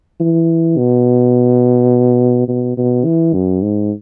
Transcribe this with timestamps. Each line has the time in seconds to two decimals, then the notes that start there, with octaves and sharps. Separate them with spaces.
0.20 E3
0.78 B2
2.48 B2
2.77 B2
3.05 E3
3.34 F#2
3.62 G#2